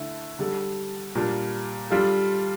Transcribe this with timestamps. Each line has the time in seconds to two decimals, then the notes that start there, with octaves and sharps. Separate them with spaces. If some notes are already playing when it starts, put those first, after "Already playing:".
Already playing: D3 A3 E4
0.39 D3 G3 D4 A4
1.15 A#2 G3 A#3 D4
1.90 G3 D4 F4 A4